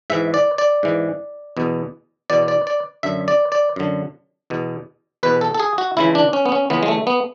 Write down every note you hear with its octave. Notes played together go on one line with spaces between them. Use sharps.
G#2 E3 E5
D5
D5
G#2 E3
E2 B2
E2 B2 D5
D5
D5
F#2 D3 E5
D5
D5
F#2 D3
E2 B2
E2 B2 B4
A4
A4
G#4
F#4
C#2 C#3 E3 E4
D4
C#4
B3
C#4
C#2 C#3 E3 B3
G#3
A3
B3